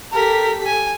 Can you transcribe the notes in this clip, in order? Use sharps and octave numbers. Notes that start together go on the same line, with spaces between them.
G4 A4 A#4 B6
G#5